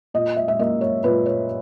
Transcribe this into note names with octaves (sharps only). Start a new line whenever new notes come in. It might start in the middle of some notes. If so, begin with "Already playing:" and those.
A#2 D#5
E5
E5
A#3 D#5
C#5
A#2 B4
C#5